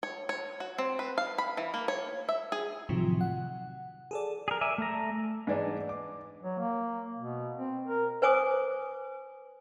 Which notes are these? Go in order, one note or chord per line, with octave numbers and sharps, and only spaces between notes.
C#5
C#5
F#4
C4
B4
F5
B5
E3
A#3
C#5
E5
G#4
A2 C3 D#3 F3 F#3
F#5
G#4 A4 D5
G#4 A#4
D5 E5 G#5
A3 A#5
G#2 E3 D4
D6
F#3
A#3
B2
C4
A#4
B4 C5 G#5 D6 D#6